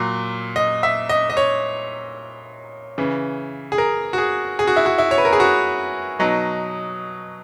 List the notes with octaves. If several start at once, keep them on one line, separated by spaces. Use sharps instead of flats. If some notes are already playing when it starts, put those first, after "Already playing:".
Already playing: A#2 F#3
D#5
E5
D#5
D#5
C#5
C#3 E3
G#4
A#4
F#4
G#4
G#4
F#4
E4
F#4
E4
C#5
B4
A#4
G#4
F#4
B2 F#3 D#4